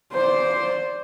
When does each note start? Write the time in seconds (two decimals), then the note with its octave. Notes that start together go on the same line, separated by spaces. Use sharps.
0.13 C5 D5